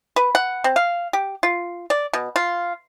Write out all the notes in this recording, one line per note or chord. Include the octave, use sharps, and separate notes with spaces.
B4
F#5
C4
F5
G4
F4
D5
B2
F4